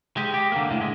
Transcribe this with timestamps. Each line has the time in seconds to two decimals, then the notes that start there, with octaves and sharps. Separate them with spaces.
0.17 G#3 G4
0.34 G4
0.52 D3 A#3
0.70 A2 D3
0.81 G#3